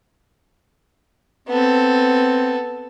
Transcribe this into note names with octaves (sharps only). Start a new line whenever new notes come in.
B3 C4 A4